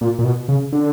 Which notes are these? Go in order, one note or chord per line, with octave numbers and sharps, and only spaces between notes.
A#2
A#2
B2
C#3
D3